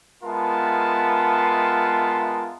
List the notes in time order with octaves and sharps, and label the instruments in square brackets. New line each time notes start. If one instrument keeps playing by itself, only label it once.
[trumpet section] G#3 B3 F4 A#4 E5 A5